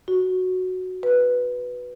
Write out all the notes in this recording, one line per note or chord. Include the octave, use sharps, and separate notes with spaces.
F#4
B4